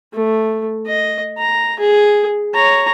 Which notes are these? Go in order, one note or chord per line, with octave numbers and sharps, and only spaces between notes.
A3
D#5
A#5
G#4
C#5 A#5